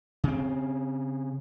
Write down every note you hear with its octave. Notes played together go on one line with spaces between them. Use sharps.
C#3 C4